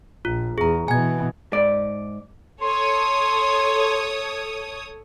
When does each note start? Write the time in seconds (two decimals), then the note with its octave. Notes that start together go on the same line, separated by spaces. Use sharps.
0.25 A#1 F4
0.58 E2 G#4 A#5
0.88 B2 E3 G#5 G#6
1.52 G#2 D5
2.62 A4 C#5 C6 D#6